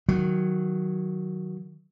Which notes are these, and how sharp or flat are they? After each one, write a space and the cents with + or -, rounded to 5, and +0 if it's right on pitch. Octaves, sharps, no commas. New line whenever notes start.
D#3 +0 F#3 +0